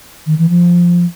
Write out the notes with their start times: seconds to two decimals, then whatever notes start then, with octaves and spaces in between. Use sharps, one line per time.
0.26 D#3
0.38 E3
0.49 F3